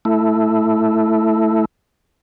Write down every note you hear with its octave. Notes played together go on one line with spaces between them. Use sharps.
A3 E4